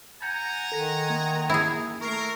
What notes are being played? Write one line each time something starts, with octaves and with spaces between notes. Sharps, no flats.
F#5 G#5 A#5 G6 C#7
D#3 A4 A#6
A#3
E4 G#4
A3 A#4 C#6 C7